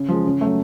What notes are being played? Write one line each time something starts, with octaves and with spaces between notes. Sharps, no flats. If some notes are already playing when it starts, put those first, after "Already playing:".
Already playing: C#3
F3 G#3
C#3
F#3 A3